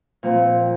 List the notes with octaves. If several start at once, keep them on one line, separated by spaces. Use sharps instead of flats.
A#2 F3 C4